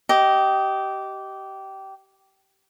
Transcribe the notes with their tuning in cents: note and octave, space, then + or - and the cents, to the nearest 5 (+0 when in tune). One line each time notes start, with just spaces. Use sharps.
G4 -20 D#5 +10